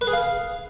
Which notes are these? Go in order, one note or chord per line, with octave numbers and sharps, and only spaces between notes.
B4
G#4
F5